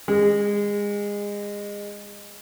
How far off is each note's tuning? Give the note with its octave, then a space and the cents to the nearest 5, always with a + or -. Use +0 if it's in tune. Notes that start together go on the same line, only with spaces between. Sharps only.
G#3 -25